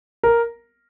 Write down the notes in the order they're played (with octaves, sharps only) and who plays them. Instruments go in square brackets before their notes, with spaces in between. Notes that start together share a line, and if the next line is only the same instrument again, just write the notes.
[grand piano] A#4